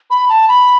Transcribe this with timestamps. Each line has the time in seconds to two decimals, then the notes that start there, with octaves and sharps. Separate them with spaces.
0.10 B5
0.29 A5
0.48 B5